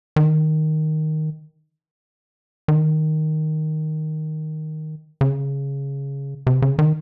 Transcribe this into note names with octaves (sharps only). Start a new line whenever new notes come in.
D#3
D#3
C#3
C3
C#3
D#3